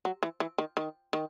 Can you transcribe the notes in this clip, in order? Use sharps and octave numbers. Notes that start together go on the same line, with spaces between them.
F#3
E3
E3
D#3
D#3
D#3